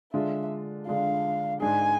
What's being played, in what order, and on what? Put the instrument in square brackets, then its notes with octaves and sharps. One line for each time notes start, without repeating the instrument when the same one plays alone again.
[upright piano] D3 G#3 D4 F4 [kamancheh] E5
[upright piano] D3 G#3 D4 F4 [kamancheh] F5
[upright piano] G#2 G#3 D4 G#4 [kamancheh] G#5